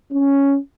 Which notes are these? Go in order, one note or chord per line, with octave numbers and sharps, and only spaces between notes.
C#4